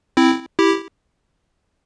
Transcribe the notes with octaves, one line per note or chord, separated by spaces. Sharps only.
C4 E4
E4 G4